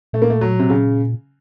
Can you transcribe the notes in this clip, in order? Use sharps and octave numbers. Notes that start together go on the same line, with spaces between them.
A#2 A3
A#3
A3
F#3
C3
C#3